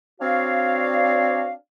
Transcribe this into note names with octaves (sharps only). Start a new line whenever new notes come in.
C4 D4 F#4 C#5 D5 F5